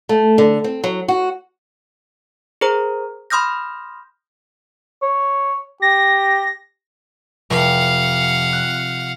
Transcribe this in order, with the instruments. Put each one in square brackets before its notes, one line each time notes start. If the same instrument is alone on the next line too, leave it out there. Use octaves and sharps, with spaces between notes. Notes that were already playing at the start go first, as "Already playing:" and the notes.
[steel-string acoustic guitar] A3
D3
C4
F#3
F#4
[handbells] G#4 A#4 C5 A#5
B5 C6 D#6 F6 G6 A#6
[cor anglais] C#5
[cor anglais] G4 [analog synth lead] A#6
[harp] F1 [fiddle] F5 F#5
[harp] F#6